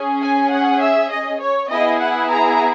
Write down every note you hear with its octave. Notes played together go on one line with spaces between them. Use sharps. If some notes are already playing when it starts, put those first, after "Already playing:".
Already playing: C#4 G#4
G#5
F#5
E5
D#5
C#5
B3 E4 G#4 D#5
F#5
A#5